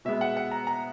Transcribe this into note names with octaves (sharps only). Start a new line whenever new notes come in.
B2 G#3 B3 E5
F#5
F#5
A#5
A#5